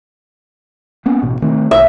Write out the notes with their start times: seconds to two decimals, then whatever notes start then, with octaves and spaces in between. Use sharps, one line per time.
1.06 A#3 B3 C#4
1.22 A1 B2
1.42 D#3 A3 C4
1.71 B1 E5